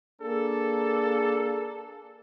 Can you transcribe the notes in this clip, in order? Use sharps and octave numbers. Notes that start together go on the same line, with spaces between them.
A#3 D4 G#4 A4